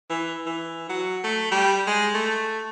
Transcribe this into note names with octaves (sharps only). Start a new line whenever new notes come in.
E3
E3
F#3
A3
G3
G#3
A3